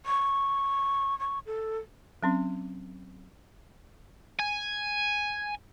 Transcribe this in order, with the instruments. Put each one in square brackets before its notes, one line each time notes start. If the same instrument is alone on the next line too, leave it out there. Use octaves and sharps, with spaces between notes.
[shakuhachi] C#6
C#6
A4
[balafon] F#3 C4 C#4
[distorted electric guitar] G#5